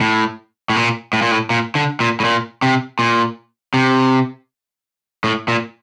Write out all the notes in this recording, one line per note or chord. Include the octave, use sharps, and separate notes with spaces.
A2
A2
A#2
A2
A#2
A2
A#2
D3
A#2
A2
A#2
C3
A#2
C3
A2
A#2